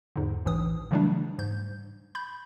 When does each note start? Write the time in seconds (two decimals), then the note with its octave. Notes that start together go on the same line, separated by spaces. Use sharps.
0.16 E2 G#2 D3
0.46 A#1 A2 E3 D#6
0.91 C#3 E3 F#3 G3 A3 D4
1.38 G#2 G6
2.15 B5 G6